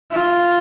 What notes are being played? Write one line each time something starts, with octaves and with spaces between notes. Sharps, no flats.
F4